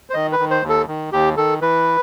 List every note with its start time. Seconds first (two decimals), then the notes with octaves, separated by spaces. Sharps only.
0.10 C5
0.14 D#3 D#5
0.32 B4
0.39 D#3
0.51 C5
0.63 D#2
0.69 A4
0.87 D#3
1.12 D#2 G4
1.37 D#3 A4
1.61 E3 B4